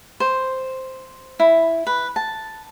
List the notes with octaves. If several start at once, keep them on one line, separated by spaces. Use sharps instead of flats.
C5
E4
B4
A5